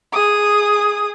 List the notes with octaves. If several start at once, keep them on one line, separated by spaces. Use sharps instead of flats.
G#4 D#6